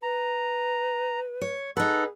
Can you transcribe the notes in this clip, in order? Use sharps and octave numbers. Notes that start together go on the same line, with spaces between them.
B4 A#5
C#5
D#4 G#4 A4 B4 F#5